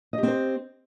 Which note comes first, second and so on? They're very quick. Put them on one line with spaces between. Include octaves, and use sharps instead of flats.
D#5 G4 C4 C5